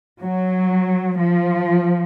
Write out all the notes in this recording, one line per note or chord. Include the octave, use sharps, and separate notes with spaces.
F#3
F3